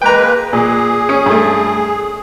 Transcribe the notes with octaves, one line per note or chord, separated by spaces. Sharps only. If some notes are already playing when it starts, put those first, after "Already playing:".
G#3 A#3 B4 G5 A#5
A#2 G#4
C#4
G2 A3